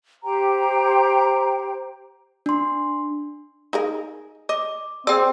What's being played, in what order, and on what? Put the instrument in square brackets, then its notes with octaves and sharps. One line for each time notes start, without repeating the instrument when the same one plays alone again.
[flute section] G4 C5 G5 A#5
[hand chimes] D4 C6
[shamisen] D#4 G#4 A#4
[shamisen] D#5 [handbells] D6
[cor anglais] C4 [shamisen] G#4 D5 [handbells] G5 E6